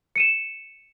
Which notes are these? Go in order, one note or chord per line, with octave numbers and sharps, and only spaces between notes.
C#7 D#7 E7